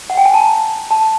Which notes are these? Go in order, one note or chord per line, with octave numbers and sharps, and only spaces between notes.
F#5
G5
G#5
A5
A#5
A5